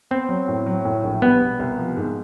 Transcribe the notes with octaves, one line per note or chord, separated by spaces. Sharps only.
B3 C4
F#3
A2
F#3
A2
A#1
G3 B3
B2
C2
F3
G#2